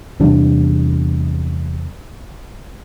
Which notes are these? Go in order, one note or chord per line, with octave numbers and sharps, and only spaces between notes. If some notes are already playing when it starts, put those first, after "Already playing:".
E2 C3 G3 D4